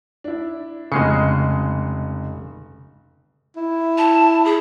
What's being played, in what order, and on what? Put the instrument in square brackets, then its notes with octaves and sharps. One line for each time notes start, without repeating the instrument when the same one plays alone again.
[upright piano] D4 E4
[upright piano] F1 C7 C#7 [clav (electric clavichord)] C#3 G#3 D#5
[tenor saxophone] E4
[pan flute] A5
G#4